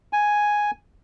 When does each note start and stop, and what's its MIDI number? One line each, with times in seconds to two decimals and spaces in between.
0.13 0.71 80